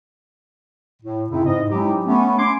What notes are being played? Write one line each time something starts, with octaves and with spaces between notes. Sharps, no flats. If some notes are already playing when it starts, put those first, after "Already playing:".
A2
F#2 C#3 C4 D#4 E4
G#2 D#5
F#3 G#3 C#4 D#4 E4 G4
A3 B3 C#4
G#5 C6 D6